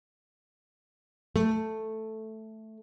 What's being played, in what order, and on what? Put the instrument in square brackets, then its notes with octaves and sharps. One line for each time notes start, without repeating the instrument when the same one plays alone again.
[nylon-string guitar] A3